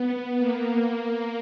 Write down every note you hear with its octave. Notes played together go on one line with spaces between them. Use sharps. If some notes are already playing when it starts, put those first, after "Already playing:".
Already playing: B3
A#3